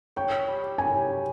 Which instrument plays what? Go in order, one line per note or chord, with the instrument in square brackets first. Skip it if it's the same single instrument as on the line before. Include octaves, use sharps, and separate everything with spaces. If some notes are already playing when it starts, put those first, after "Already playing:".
[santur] C#5 [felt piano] G5
[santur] C#5
G3
G4
[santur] C#5 [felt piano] G#5
[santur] G4
G4